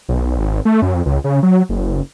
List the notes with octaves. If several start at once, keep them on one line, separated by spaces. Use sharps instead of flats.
B1
G#1
A3
F#2
F2
C#2
C#3
F#3
F#1